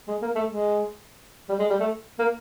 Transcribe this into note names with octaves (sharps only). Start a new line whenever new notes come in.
G#3
A#3
A3
G#3
G3
G#3
G3
A3
A#3